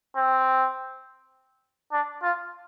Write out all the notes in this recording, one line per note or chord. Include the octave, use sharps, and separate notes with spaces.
C4
D4
F4